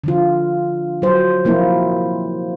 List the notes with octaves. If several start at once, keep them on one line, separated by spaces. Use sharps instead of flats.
D3 F3 F4
F#3 C5
F3 A#3 C4 E4